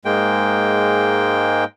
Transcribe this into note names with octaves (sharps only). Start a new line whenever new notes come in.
G#2 G#3 A#3 G5